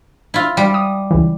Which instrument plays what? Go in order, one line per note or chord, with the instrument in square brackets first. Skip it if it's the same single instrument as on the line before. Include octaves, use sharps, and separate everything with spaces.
[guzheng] E4 F4
G3
[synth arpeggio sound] D#6
C#2 E3